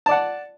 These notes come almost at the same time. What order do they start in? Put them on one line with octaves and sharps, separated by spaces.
A5 D5 F#5